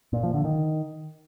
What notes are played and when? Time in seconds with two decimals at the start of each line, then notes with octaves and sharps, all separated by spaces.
0.13 A#2
0.23 F3
0.34 D3
0.44 D#3